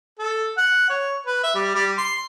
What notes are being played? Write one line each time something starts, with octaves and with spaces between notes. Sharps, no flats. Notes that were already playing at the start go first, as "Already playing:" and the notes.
A4
F#5
C#5
B4
E5
G3
G3
C6